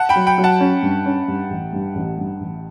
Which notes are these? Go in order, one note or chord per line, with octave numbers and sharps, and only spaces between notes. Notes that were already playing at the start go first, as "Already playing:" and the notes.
Already playing: F#5 A5
G5 B5
F#3
G5 B5
F#3
F#5 A5
C#4
G2
C#4
G2
A1
G2
A1
G2
A1